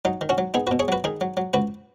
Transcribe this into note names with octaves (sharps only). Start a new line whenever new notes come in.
F#3 D#4
D#3
C#4 F#4
F#3
B3 D#4 G#4
F#4 B4
B2
G#4 C#5
F#3 F#4 B4
D#3 D#4 G#4
F#3
F#3
C#2 F#4 B4